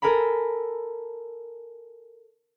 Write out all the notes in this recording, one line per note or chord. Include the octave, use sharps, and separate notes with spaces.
A4 A#4 G#5 A#5 B5